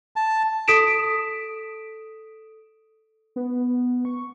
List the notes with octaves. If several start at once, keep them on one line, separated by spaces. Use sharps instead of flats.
A5
A4 D#6 B6 D7 E7
B3
C#6